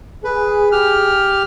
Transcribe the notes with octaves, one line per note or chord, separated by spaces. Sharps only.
G#4 B4
G4 F6